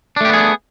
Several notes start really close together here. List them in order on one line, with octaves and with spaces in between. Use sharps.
D4 A3 G4 B3 G#4